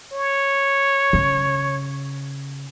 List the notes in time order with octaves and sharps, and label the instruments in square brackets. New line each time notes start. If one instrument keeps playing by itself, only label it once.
[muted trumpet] C#5
[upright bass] C#3